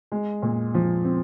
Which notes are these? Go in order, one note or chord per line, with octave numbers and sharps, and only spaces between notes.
G#3
A#2
F3
C4